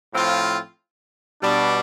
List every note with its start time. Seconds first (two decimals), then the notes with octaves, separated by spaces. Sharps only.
0.12 A2 F3 C4 F4
1.41 B2 G3 D4